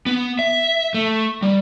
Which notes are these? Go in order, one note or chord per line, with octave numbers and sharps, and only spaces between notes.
B3
E5
A3
G3